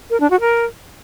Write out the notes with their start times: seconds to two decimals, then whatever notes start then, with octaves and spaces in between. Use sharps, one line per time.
0.10 A#4
0.20 D4
0.30 F#4
0.40 A#4